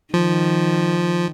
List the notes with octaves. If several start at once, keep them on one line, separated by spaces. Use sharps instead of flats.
D#3 F3